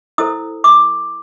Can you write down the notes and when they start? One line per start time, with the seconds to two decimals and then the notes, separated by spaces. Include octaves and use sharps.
0.18 E4 A4 C5 D#6
0.64 D6